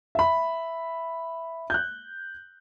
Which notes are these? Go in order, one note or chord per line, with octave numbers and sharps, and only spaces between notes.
E5 B5
F#6 G6